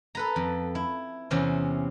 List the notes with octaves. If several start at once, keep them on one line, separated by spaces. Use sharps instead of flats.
A4 B4 A#5
F2
E4
E2 C3 C4 C#4